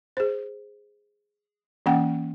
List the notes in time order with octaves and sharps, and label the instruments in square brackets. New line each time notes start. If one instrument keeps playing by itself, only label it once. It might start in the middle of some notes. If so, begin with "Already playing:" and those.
[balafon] G#4 C5
E3 A#3 C#4 F#5 G5